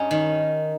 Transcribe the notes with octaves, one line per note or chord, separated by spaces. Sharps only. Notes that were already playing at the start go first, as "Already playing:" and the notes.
Already playing: G2 C#4 D#4
D#3